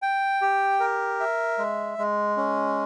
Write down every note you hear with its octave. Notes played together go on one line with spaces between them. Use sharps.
G5
G4
A#4
E5
G#3
G#3
C#4